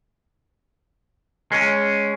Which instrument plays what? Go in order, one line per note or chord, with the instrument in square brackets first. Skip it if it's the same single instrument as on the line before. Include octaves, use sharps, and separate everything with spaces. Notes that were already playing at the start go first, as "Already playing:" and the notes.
[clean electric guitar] G#3 C#4